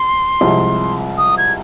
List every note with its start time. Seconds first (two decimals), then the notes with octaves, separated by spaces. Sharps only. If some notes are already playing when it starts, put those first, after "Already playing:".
Already playing: C6
0.41 C2 C3 F3 G#3
1.18 D#6
1.38 G#6